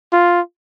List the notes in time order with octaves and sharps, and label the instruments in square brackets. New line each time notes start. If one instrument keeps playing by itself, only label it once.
[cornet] F4